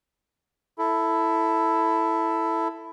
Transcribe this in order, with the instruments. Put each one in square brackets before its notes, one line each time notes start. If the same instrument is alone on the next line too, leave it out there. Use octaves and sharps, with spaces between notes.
[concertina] E4 A4